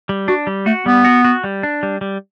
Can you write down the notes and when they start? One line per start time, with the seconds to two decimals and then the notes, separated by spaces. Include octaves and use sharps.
0.09 G3
0.28 D4 F#4
0.47 G3
0.66 A3 F#4
0.86 G3 B3
1.05 F#4
1.25 F#4
1.44 G3
1.63 D4
1.83 G3
2.01 G3